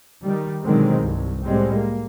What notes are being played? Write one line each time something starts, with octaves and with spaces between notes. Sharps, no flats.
D#3 G3
B2 D3 D#3 F#3 G#3 C4
C2 G2
A2 G3 G#3 C4
A#3